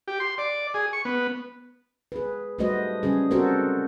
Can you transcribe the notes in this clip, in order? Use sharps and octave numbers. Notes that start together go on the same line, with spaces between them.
G4
C6
D5
G#4
C#6
B3
G#4 B4
G3 A3 F#4 B4 C5 D#5
G3 C#4 G#4
C4 F#4 A4 A#4 C5